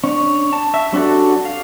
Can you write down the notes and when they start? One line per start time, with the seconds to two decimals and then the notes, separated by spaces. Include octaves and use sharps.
0.04 C#4 D4 C#5
0.53 A5
0.74 E5
0.93 G3 C#4 D4 F#4 A4
1.45 F5